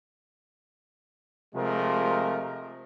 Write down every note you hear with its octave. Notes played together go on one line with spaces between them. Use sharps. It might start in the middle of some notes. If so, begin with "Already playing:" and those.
C3 F3 G#3 A3 A#4